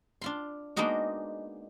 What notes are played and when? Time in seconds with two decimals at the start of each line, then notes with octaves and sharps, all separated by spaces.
0.22 D4 F4 C6
0.76 G#3 A#3 B3 D4 D#4 F#4